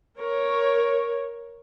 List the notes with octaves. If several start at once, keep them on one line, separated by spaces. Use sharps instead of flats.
A#4 C#5